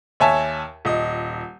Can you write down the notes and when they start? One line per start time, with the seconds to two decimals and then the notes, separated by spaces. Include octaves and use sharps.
0.20 D#2 C#5 E5 G#5 A5
0.85 D#1 D#5